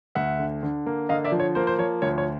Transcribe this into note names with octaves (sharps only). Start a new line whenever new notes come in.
D2 E5 F#5
D3
D3
A#3
D3 D#5 F5
D5 E5
F3
C#5
A#3 C5
C5
F3 C#5
D2 C#5
C#5